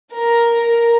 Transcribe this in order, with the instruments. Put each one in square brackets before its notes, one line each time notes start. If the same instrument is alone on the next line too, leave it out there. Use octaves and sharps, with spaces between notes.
[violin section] A#4